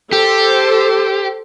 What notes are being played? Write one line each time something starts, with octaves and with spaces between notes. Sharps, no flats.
G4 A4 C5